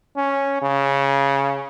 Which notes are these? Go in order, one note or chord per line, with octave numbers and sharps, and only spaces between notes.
C#4
C#3